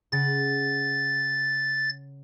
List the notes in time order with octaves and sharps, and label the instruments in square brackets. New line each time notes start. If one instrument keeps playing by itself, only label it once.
[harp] C#3 F#5 [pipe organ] A6